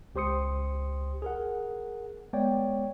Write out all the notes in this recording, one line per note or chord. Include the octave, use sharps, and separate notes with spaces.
C#2 G4 C5 C6 D#6 C#7
G#4 A#4 F#5
G#3 B3 C#5 D5 G5